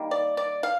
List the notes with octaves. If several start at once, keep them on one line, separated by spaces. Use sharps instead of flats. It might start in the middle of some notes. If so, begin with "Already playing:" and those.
Already playing: D#3 G3 A#3
D5
D5
F5